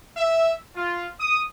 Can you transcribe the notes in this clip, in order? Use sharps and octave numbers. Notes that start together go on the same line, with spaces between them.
E5
F4
D#6